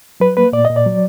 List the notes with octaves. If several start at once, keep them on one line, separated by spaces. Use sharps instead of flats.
F#3 B4
A#3 B4
A#2 D5
D#5
A#2
D5
F#3